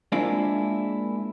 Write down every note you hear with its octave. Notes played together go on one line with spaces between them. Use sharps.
G#3 A#3 C4 D4 E4 F4